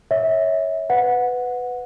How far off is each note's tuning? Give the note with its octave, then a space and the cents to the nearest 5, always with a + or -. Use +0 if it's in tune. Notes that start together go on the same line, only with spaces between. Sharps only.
C#5 +0 E5 -25
B4 +15 F#5 -15